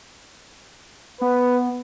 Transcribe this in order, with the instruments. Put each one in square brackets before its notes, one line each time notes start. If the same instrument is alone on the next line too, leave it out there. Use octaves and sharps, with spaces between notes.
[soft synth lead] B3 [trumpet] B4